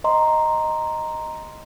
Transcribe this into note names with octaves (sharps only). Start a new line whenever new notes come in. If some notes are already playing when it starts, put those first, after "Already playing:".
D#5 A#5 C6